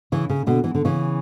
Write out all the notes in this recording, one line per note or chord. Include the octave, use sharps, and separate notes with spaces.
C#3 E3
C#3
B2 D3
E3
D3
C#3 E3